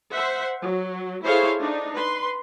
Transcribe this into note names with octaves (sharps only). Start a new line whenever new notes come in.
C5 E5 F#5
F#3
E4 G#4 A4 C5 C#5 F5
D4 D#4
B4 C6